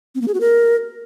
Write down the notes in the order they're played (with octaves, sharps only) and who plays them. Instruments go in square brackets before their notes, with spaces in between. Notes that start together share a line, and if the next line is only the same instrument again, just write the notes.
[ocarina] C4
A#3
G#4
F#4
A#4